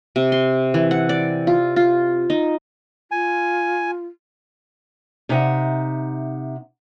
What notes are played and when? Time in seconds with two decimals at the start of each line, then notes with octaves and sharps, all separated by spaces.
0.16 C3
0.32 C6
0.74 E3
0.91 F#5
1.09 D5
1.47 F4
1.76 F4
2.30 D#4
3.11 F4 G#5
5.29 C3 D#4 E5 F#5